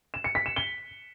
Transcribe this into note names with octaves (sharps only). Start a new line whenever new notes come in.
E7
C#7
B6
E7
G7